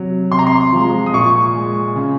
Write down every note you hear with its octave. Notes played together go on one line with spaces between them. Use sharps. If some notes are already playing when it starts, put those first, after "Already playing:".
Already playing: C3 F#3
C3 C6
A#5
C6
F3 G#3
D#6
A#2 C#6
G#3
C#3